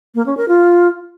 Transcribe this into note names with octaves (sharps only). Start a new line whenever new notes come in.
A#3
C#4
A#4
F4